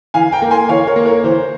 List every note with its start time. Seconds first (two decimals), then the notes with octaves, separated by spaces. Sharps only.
0.14 E3 F5 G#5
0.32 G5 A#5
0.42 A#3
0.51 G#5 C6
0.69 E3 C#5 F5
0.87 A#4 C#5
0.96 A#3
1.05 A#4 C#5
1.24 E3 C5